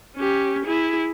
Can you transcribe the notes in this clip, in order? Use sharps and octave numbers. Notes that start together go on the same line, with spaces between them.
C#4 G4
E4 G#4